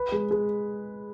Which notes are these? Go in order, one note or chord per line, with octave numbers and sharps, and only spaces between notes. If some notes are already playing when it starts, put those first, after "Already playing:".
Already playing: B4
G#3
G#3